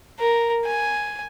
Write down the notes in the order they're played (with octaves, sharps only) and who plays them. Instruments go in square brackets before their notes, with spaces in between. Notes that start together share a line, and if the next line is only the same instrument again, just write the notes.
[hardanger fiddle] A#4
G#5